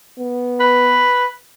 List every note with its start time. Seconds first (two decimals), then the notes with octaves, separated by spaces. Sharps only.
0.19 B3
0.60 B4